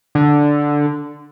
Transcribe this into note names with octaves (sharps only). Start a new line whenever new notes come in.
D3